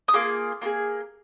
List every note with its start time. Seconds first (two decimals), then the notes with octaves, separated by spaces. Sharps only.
0.08 D#6
0.13 A#3 F4 G#4 D6
0.62 A#3 F4
0.65 G#4